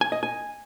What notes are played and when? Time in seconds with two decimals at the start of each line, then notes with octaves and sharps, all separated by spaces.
0.01 G#5
0.12 D#5
0.23 G#5